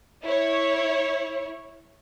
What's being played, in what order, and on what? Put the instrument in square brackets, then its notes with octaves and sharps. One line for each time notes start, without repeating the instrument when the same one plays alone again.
[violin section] E4 C#5